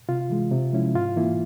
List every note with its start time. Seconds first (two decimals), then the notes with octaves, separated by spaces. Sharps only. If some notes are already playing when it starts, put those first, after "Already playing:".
0.09 C3 F4
0.30 E3 G#3
0.51 C3
0.73 F3 G#3 C#4 E4
0.95 G#2 F4
1.16 E3 A#3 E4